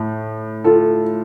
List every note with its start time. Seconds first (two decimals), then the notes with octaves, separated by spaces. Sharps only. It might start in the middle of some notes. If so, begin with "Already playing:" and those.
Already playing: A2
0.64 F4 A4